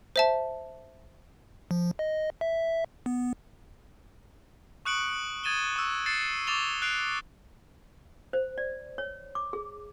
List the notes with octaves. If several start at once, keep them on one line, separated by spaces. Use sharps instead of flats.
C5 E5 A5
F3
D#5
E5
B3
C#6 D#6 F#6 C#7 D7 F#7
D#6 G#6 A6 D#7 E7 G7
C#6 E6
G#6 A6 C7 C#7 E7
C#6 D6 A6 E7 F7 G7
F#6 C7 D7 F7
C5
D5
C#5
D6
G#4